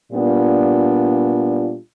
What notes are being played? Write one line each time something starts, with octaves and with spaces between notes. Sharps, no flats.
A#2 G3 B3 D4 F4